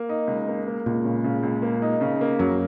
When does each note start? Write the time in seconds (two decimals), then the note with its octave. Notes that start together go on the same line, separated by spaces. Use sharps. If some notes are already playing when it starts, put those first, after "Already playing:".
Already playing: A#3
0.09 D#4
0.27 C#2
0.48 A#3
0.67 A#3
0.86 C#2 A#2
1.04 C#3
1.24 C#3
1.43 C#2
1.62 A#3
1.82 D#4
2.01 C#3
2.21 A#3
2.39 F#2 F#3